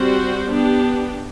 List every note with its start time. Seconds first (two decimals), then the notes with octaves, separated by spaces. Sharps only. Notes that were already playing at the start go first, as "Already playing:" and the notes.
Already playing: G3 C4 F#4 C5
0.50 B3 D4 G4